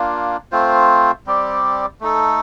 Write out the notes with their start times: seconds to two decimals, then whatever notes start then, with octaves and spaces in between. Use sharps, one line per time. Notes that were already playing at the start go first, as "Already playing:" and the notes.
Already playing: A#3 D4 F4
0.52 A3 C4 F4 C5
1.27 G3 C4 G4 D5
2.01 A3 D#4 A4